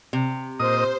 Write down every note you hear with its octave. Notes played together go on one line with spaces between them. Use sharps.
C3
A#2 C5 D#5 D#6